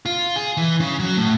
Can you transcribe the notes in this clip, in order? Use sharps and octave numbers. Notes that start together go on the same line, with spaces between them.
F4
G#4
E3
C#3
F#3
A2